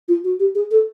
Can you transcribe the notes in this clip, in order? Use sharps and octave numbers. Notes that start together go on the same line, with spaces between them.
F4
F#4
G4
G#4
A4